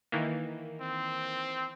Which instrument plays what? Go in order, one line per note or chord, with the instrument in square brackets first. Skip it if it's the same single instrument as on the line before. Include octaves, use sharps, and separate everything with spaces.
[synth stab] D#3 E3 A#3
[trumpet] C4